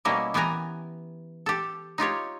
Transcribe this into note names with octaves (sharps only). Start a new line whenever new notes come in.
B2 G3 A#3 C#4 E4 D#5
E3 B3 G4 G#5 A#5
G4 A4
D#4 F4 G4 C#5